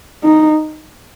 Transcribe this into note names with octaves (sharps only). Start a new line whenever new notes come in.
D#4